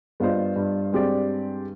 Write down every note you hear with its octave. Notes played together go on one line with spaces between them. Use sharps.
G2 B3 F4 C5 D#5
G2
G#3 C4 G4 D5